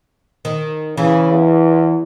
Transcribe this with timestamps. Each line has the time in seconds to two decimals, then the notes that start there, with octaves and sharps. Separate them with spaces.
0.45 D#3
0.97 C#3 E3
1.32 E2